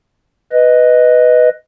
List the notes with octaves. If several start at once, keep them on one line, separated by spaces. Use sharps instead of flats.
B4 D#5